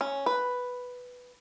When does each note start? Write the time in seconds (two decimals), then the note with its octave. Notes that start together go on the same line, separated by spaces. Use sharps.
0.01 C#4
0.26 B4